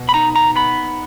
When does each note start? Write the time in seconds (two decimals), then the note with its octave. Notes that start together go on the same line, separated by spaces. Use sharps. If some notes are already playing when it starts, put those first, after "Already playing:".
Already playing: B2
0.09 B5
0.14 D#4 A#5
0.36 A#5
0.56 B3 B5